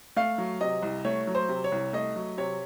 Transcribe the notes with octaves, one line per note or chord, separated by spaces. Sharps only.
A3 F5
F#3
C3 D#5
C2
A3 C#5
F#3
C5
C3
C#5
C2
A3 D#5
F#3
C3 C#5